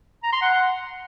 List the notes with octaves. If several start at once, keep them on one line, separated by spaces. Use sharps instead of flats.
A#5
C6
F#5